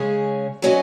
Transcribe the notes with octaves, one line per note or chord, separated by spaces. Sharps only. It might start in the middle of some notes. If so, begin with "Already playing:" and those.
Already playing: C#3 G#3 C#4 G#4
F#3 C#4 F#4 B4 D#5